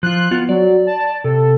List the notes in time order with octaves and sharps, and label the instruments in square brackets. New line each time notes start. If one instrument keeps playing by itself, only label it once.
[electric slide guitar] F3 F4 [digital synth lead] F#6
[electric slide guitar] B3 F4
[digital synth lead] F#3 [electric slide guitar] D5
[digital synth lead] A5
[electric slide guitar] C3 [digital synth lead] A4